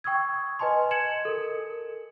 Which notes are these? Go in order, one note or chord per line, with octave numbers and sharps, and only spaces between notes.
G5 C#6 D#6 E6 G#6
B4 D#5 G#5 A5 C6
G#6 C#7 E7 F#7
A4 A#4